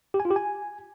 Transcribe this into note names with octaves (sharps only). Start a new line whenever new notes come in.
G4
G#5
F4
G4
G#5